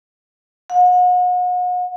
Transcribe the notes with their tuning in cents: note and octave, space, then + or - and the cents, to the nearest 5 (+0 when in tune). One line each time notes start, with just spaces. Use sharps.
F#5 -40